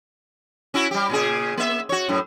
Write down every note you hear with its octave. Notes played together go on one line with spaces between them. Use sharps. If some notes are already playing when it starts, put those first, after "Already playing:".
C#4 E4 F#4
G3 G4
A#2 C#3 G#4
A#3 E5
F#4 C#5
F#2 A2